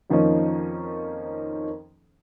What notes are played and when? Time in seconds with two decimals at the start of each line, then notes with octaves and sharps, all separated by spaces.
0.10 F2 D#3 F3 A#3 C#4 D#4